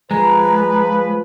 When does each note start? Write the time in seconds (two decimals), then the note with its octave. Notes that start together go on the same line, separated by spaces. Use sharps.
0.11 F3 G#3 B4 A#5